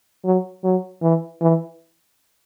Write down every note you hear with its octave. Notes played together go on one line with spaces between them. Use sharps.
F#3
F#3
E3
E3